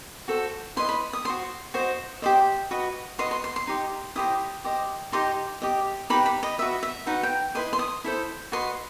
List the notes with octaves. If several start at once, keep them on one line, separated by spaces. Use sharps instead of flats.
F#4 A4 C5
E4 B4 D#5 C6
B5
D#6
F#4 C5 D#5 C6
F#4 C5 D#5
G4 C5 D#5
F#4 B4 D#5
F#4 B4 D#5 C6
C6
C6
C6
D#4 G4 D#5
E4 G4 C5 D#5 D#6
G4 C5 D#5
D#4 G4 D#5 C6
G4 D#5
D#4 G4 B4 B5
B5
D#5
F#4 B4 D#5 E5
E5
D#4 F#4 B4 F#5
G5
E4 B4 D#5 C6
C6
D#6
E4 A4 C5
F#4 B4 D#5 C6